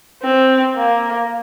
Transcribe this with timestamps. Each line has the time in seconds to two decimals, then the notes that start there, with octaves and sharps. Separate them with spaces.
0.23 C4
0.76 A#3